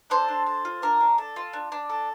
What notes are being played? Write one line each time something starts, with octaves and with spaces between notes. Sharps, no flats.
D4 A4 C5
D4
A4
F4
D4 A#4
D4
A4
F4
D4
D4
A4